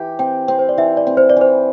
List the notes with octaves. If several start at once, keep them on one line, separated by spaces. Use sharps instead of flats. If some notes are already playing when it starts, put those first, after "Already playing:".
Already playing: E3 G4
C4 G5
C4
C5
D5
E3 E5
D5
C4
C5
D5
E3 C5